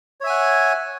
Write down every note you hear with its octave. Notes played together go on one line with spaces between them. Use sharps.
C#5 E5 F#5 G#5